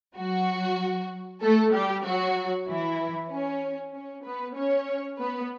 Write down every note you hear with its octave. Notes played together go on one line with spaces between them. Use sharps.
F#3 F#4
A3 A4
G3 G4
F#3 F#4
E3 E4
C#4
C#4
B3 B4
C#4 C#5
B3 B4